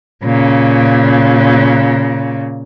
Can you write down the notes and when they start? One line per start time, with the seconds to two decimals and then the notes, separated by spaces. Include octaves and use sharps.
0.23 A#2 C#3